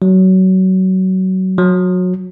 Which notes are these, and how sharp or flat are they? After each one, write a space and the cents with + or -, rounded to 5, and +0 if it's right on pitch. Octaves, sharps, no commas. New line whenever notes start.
F#3 +20
F#3 -25